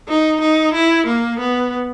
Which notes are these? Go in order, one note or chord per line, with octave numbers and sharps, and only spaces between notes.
D#4
D#4
E4
A#3
B3